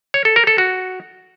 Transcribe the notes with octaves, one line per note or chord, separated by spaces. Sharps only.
C#5
A4
A#4
A4
F#4